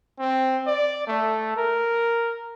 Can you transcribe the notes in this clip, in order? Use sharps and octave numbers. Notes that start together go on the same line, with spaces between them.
C4
D5
A3
A#4